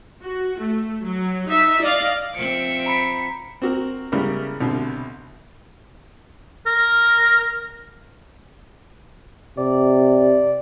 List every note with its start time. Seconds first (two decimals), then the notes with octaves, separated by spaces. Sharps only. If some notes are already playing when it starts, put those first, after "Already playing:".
0.23 F#4
0.60 A3
1.03 F#3
1.49 D#4 E5
1.82 D5 D#5 F5
2.34 F3 C4 E5 C#7 D7
2.86 A#5 B5 B6
3.62 C4 F#4 A#4
4.12 C#3 G3 G#3 B3 E4 A#4
4.61 C2 B2 D3
6.66 A#4
9.57 C3 D5